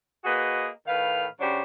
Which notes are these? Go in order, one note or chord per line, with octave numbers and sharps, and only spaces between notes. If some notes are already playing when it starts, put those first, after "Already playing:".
A#3 F#4 G#4 B4 D#5
A2 D#3 B4 F5
C#3 F#3 D4 G4 C5